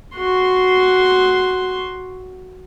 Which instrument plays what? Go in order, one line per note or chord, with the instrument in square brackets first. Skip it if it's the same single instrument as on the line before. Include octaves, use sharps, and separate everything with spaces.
[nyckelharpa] F#4 C6